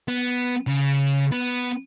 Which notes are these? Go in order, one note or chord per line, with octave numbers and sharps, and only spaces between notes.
B3
C#3
B3